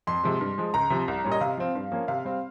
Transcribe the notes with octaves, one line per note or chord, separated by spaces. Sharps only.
F2 C6
C3 F3 G#3
G2
F3 G#3
C#2 A#5
C3 F3
C2
A#2 G3 C#4
D#5
C3 F5
F3 C4
G2
F3 A#3 C#4
C3 F5
G3 C4